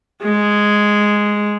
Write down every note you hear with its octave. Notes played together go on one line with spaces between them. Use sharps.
G#3